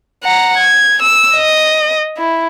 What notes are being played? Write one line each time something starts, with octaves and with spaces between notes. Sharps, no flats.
F#5 A#5
G#6
E6
D#5
E4